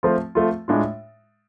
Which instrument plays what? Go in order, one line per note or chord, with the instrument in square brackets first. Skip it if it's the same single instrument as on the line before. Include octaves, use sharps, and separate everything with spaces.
[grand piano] F3 A3 C4 F4
F3 A3 C4 F4
A2 G#3 D4 F4